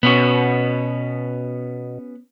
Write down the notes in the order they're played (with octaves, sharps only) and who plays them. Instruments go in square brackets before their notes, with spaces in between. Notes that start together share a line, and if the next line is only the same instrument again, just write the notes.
[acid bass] B2 [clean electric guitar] B3 C#4 F#4